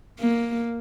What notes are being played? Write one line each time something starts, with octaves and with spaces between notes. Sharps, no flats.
A#3